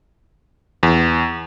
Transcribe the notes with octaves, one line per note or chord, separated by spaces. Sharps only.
E2